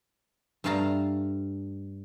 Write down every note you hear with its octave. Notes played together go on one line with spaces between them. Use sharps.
G2 A3 F5 A5 A#5